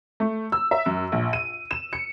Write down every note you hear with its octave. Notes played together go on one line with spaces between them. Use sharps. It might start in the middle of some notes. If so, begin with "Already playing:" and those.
A3
E6
E5
F#2
A#1
D#7
E7
C#7